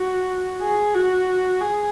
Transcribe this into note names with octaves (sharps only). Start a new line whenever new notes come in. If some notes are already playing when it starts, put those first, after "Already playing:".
Already playing: F#4
G#4
F#4
G#4